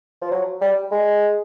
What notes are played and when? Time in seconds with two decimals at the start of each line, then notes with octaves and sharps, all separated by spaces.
0.22 F3
0.31 F#3
0.61 G3
0.92 G#3